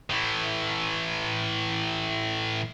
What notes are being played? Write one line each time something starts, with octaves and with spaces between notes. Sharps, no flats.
A2 E3